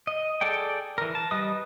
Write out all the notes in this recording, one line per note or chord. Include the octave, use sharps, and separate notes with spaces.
D#5
G#4 A4 D5 G5
E3 A#4
A5
G3 B4 D#5 D#6